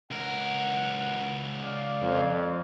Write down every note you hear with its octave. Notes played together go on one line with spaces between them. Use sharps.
C#2 A#4 F#5
D5 F5
F2